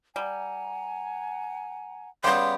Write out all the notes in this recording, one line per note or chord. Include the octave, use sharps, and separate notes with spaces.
G3 F#5 G#5 A#5
C#3 G3 B3 G4 C6